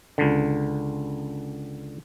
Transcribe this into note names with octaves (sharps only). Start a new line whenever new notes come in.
C#2 D3